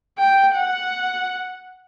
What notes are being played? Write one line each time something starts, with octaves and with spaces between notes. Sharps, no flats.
G5
F#5